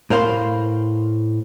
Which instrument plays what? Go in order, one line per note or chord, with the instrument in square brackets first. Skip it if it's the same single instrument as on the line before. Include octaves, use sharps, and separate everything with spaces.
[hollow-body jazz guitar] A2 A#4 C5 F5 B5 C6